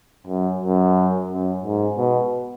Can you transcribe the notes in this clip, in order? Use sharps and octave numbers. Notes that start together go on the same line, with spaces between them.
F#2
F#2
F#2
G#2
B2